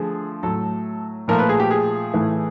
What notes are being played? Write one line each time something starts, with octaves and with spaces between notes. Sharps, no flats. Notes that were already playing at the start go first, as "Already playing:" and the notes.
Already playing: D3 F3 A3 G#4
A2 F#3 A3 A4
A#2 F3 A3 A#4
B4
G#4
G4
G#4
A2 E3 A3